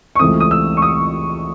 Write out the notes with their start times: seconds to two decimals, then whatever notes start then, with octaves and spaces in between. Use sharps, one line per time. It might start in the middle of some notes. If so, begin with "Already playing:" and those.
0.15 C#6
0.19 C#2 C3 E3 A3 C4 D#6
0.40 D#6
0.51 E6
0.77 C#6
0.82 D#6